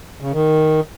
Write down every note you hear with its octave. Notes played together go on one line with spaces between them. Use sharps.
C#3
D#3